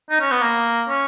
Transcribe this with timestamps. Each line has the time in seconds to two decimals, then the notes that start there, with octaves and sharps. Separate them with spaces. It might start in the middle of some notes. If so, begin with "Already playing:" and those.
0.10 D#4
0.21 C#4
0.31 B3
0.42 A#3
0.89 C#4